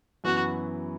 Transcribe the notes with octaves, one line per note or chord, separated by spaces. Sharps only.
F#2 E3 B3 F#4